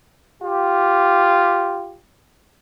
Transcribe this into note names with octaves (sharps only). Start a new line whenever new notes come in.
F4 G4